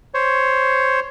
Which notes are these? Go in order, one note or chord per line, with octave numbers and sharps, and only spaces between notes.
C5 C#5